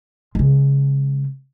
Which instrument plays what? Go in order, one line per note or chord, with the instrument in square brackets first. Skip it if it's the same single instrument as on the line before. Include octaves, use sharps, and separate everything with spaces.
[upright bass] C#3 G#3